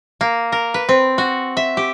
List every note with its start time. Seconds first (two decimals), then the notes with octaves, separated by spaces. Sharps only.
0.21 A#3
0.52 A#4
0.74 B4
0.89 C4
1.18 F#4
1.57 E5
1.77 G4